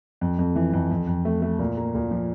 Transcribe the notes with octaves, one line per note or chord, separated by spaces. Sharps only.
F2
F2
E3
F2
F2
F2
A3
A3
A#2
A#3
A#2
F3